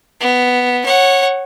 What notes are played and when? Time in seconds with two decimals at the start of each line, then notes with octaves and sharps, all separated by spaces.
0.20 B3
0.85 C#5 F#5